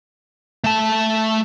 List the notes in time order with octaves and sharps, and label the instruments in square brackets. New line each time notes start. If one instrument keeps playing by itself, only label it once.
[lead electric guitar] A3 A5